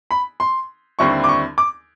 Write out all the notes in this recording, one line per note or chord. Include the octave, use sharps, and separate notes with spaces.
B5
C6
D#2 D3 G3 C4 E4 C#6
D6
C#6
D6